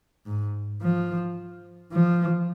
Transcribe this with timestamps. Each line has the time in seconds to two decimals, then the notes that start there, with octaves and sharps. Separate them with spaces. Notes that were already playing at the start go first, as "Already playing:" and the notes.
0.27 G#2
0.82 F3
1.93 F3